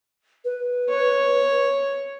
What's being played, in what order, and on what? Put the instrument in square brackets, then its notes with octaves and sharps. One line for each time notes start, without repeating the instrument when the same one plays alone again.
[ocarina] B4
[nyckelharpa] C#5